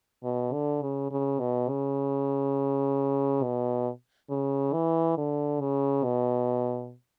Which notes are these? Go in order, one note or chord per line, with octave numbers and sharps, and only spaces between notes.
B2
D3
C#3
C#3
B2
C#3
B2
C#3
E3
D3
C#3
B2